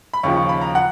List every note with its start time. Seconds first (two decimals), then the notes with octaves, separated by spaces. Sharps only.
0.13 B5
0.23 D#2 C#3 F3 C#6
0.36 C#6
0.49 B5
0.61 A#5
0.75 F#5